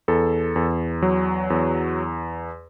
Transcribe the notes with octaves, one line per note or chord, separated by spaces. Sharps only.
E2 A4
E2
F#3
E2